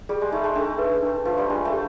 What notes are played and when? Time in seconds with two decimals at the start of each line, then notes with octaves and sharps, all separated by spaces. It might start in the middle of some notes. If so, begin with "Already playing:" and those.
0.09 G3 G#4
0.21 G#3
0.32 A3 D#4
0.44 G#3
0.55 A3 D4
0.79 B4
1.03 D4
1.25 F3 B4
1.38 G3
1.49 G#3 D4
1.65 A3
1.72 G4